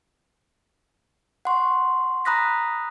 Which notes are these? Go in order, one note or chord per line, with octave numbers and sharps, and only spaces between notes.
F#5 C6 C#6
A#5 B5 D#6 F#6 A#6 B6